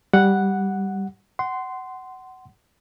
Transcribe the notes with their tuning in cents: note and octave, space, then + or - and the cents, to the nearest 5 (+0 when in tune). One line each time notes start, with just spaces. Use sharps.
G3 +0 F#5 +0
F#5 +20 C6 -10